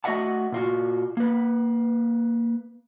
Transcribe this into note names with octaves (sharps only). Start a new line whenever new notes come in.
A3 F#4 D#5 E5 F#5 A5
A#2 F4 F#4
A#3 B4